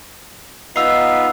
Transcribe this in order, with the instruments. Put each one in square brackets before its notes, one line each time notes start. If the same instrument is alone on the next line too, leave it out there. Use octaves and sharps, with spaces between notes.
[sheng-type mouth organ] B3 F4 B4 [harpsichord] D#4 [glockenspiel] E6 C7